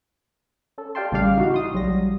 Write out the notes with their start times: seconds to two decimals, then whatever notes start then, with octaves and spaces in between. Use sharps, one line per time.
0.78 C#4 A4
0.95 G4 D5 F5 G5 A5 C6
1.12 A1 C#3 G3 D5 F5
1.37 D#4 E4 F#4 G4
1.54 C6 D#6
1.73 A#1 F#3 G3 A#6